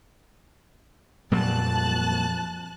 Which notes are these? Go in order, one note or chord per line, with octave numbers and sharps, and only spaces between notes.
F2 A#2 F#3 G3 A5 F#6